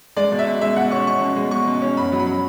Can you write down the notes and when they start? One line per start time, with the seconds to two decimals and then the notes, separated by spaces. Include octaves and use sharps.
0.17 G#3 D5
0.32 B2
0.39 E5
0.47 B2
0.61 G#3 E5
0.76 B2 F#5
0.91 C#4 C#6
1.07 B2 C#6
1.21 B2
1.36 G#3
1.51 G#3 C#6
1.67 B2
1.82 C#4
1.97 F#2 B5
2.12 F#3
2.20 B5
2.26 F#3